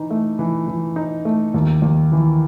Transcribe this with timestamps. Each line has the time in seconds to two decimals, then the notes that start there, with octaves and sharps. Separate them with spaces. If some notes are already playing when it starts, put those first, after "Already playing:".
Already playing: E3 D#4
0.11 A3
0.39 E3
0.68 E3
0.96 D#4
1.25 A3
1.54 D#2
1.82 D#2
2.12 E3